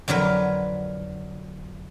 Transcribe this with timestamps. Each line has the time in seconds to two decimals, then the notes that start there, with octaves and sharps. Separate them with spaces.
0.08 F2 D3 F#3 A#4 B4